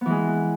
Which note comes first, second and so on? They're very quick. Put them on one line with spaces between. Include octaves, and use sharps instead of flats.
B3 E3 G#3